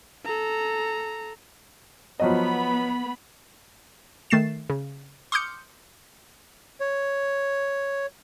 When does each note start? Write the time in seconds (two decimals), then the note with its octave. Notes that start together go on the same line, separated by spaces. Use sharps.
0.25 A4 A#5
2.20 F3 F#3 B3 D#5 B5
4.30 D#3 A3 A6 C7 E7
4.70 C#3
5.32 C6 D6 D#6 F6 G6 C#7
6.80 C#5